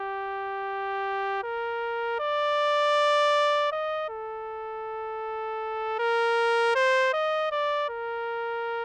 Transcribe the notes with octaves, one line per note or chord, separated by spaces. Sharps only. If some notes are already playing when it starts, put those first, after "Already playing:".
Already playing: G4
A#4
D5
D#5
A4
A#4
C5
D#5
D5
A#4